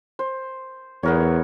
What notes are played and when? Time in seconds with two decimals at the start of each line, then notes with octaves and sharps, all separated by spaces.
0.19 C5
1.03 E2 B3 A#4 C#5